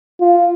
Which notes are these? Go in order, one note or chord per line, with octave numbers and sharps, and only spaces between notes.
F4